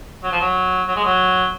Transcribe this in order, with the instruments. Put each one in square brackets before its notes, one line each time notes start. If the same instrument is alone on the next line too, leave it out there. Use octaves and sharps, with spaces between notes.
[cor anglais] F#3
F3
F#3
F#3
G#3
F#3